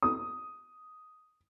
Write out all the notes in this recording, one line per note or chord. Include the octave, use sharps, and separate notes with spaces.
D#6